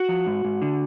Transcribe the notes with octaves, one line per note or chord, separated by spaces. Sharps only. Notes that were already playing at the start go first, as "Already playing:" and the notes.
Already playing: F#4
F3
G#2
G#2
D3